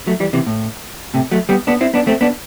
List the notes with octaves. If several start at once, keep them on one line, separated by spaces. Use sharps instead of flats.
F#3 A3
E3 G3
C3 E3
A2
A2 C3
F#3 A3
G3 B3
B3 D4
C4 E4
B3 D4
A3 C4
B3 D4